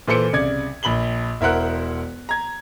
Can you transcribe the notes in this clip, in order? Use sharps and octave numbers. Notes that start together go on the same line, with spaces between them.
A#2 E3 A4 C5 C#7 D7
C2 C#3 D5 G#6
A#1 B5 F#7 G7
E1 E4 A#4 C5 F#5 F#6
A#5 G#6